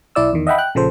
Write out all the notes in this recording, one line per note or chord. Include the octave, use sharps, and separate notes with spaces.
B1 E4 D5 E6
E2 D#3
D#5 E5 F#5 G5 B5
G5 F#6
A#1 C#3 F3 A4 C5